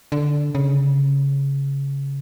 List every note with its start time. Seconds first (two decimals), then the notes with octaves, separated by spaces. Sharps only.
0.12 D3
0.55 C#3